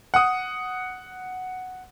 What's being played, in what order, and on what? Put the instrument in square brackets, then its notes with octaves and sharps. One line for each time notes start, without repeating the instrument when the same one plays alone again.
[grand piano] F#5 D#6